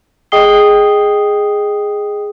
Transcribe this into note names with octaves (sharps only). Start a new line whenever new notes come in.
G#4 D#5 G5 D#6 C7 G7